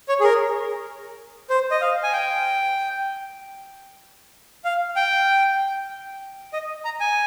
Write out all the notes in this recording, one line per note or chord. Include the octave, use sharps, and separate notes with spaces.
C#5
G#4
A#4
C5
D#5
F5
G#5
G5
F5
G5
D#5
A#5
G#5